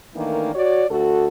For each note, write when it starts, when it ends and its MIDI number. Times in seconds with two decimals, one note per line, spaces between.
0.15 0.53 51
0.15 0.53 52
0.15 0.53 57
0.15 0.53 58
0.15 0.53 62
0.15 0.53 63
0.54 0.85 66
0.54 0.85 73
0.54 0.85 74
0.90 1.28 38
0.90 1.28 66
0.90 1.28 69